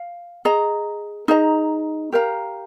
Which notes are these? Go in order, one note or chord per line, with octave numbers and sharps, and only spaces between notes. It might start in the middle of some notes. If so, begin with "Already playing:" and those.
Already playing: F5
G#4 D#5 A#5
D#4 G#4 D#5 A#5
G4 A#4 F5 A#5